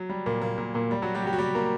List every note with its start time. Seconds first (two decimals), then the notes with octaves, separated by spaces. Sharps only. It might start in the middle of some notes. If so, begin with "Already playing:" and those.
Already playing: F#3
0.09 G3
0.26 A#2 A#3
0.42 A#2 A#3
0.58 A#2 A#3
0.74 A#2 A#3
0.91 G3
1.02 F#3 F#4
1.14 G3 G4
1.23 F#4
1.26 G3 G4
1.33 F#4
1.38 G3 G4
1.55 A#3 A#4